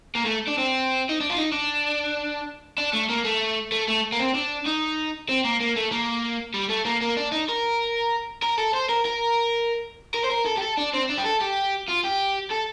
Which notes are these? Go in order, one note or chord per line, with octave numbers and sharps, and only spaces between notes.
A#3
A3
D4
C4
D#4
D4
F4
D#4
D4
D4
A3
A#3
A3
A3
A3
A#3
C4
D4
D#4
C4
A#3
A#3
A3
A#3
G3
A3
A#3
A#3
D4
D#4
A#4
A#4
A4
C5
A#4
A#4
A#4
C5
A#4
A4
G4
A4
D4
C4
D4
G4
A4
G4
F4
G4
A4